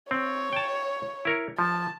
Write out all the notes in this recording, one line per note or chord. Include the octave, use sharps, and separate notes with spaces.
C4 C#5
G5 A5
E4 A#4 C#5
F3 A5